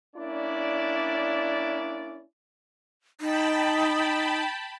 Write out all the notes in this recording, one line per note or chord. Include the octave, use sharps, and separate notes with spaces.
A#3 C#4 D4 E4 D5
D#4 G5 A5 B5